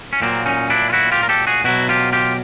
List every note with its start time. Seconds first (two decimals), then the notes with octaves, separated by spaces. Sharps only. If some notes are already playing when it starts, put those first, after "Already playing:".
0.13 C#4
0.22 A#2 F#3 A#3 C4
0.46 C#4 D#4
0.70 D4 E4
0.90 F4
0.93 E4 F#4
1.12 F4 G4
1.23 A#4
1.29 G4 A4
1.47 F#4 G#4
1.64 B2 F#3 E4 F#4
1.89 F4 G4
2.13 F4 G4